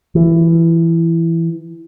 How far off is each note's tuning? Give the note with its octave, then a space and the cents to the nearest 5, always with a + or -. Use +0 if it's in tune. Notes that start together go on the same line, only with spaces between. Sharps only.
E3 +10